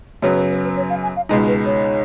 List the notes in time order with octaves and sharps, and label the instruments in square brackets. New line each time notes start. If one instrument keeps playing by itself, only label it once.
[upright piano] F#2 C#3 F#3 B3 [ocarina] C#5
[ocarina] B4
B4
B4
C#5
F5
G#5
F5
[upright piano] C#2 B2 G#3 D#4 [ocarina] D#5
[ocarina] B4
C#5